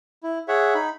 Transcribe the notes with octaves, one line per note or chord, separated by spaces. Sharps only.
E4
G#4 C#5 E5 F#5
D#4 B5